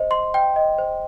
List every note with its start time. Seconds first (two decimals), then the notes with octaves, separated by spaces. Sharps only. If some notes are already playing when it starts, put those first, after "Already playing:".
Already playing: C5 D#5
0.11 C6
0.34 G5
0.56 D#5
0.78 C5